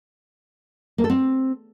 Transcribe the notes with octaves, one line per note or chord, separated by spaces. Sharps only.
A#3
A4
C4